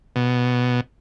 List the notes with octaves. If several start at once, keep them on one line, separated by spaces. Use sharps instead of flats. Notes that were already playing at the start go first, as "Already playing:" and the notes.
B2